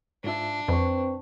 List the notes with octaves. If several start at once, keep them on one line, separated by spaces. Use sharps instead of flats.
G#2 D4 F4 E5
F2 C4 B4 C#6